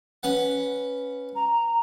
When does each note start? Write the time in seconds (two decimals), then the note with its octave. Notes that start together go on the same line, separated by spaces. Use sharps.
0.23 C#4 B4 F#5
1.35 A#5